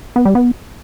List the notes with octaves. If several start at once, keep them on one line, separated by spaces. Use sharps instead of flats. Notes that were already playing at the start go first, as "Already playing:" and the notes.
B3
G3
B3